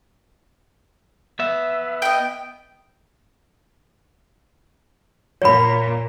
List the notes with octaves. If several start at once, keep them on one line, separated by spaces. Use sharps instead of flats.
B3 E5
D#5 G5
A#2 C#5 B5